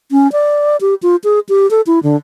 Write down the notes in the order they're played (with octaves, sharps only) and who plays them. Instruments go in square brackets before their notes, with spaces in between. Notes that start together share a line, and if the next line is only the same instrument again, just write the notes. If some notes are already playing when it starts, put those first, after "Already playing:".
[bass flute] C#4
D5
G4
F4
G#4
G4
A4
E4
D3